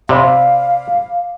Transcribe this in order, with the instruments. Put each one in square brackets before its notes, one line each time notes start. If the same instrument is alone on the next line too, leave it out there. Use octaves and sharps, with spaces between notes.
[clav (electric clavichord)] C3 [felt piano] C5 D5 B5 [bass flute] F5